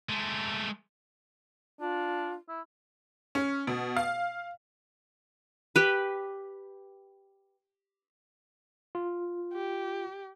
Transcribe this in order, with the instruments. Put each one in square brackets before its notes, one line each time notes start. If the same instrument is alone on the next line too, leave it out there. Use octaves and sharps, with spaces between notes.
[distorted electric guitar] G#3 A3
[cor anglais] D4 [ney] F4
[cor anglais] E4
[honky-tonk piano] C#4
B2
F5
[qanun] G4 B4
[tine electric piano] F4
[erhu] G4